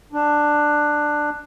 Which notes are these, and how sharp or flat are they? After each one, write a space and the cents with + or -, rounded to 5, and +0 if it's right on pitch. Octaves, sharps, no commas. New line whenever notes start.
D4 +10